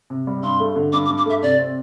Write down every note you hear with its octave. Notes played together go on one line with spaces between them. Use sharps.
C3
G3
G2 C6
A3
D3
G2 D6
D6
G2
D6
A3 E5
C3 D5
C4